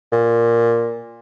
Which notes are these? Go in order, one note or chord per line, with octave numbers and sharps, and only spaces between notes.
A#2